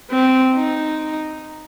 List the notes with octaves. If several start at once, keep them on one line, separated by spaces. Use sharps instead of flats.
C4
D#4